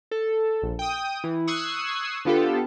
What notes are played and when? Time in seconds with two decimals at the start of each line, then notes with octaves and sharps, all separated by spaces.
0.11 A4
0.62 A#1
0.79 G5 D#6
1.24 E3
1.47 C#6 D#6 E6 F#6 G#6 C7
2.25 D3 B3 F4 G4 A4